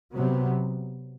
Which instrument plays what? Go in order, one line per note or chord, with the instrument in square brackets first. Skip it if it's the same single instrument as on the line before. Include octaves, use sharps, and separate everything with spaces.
[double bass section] C3 F#3 B3